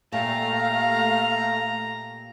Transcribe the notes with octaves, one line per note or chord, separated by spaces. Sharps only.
A#2 A3 G4 F5 A5 A#5